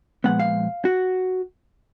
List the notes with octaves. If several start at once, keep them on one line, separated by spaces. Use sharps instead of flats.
A#2 F3 G#3 B3 F#5
F5
F#4